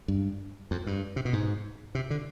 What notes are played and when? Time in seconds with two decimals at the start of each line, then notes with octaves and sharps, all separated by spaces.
0.08 G2
0.71 F2
0.87 G2
1.16 C3
1.25 B2
1.33 G#2
1.95 C3
2.10 D3